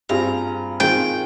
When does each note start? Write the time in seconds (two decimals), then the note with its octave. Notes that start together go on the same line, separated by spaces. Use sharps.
0.09 G2 G3 C4 F4 G#4 A#5
0.80 D#3 G#3 C4 F4 G#4 G5